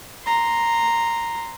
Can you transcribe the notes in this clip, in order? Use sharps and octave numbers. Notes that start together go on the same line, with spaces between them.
A#5 C6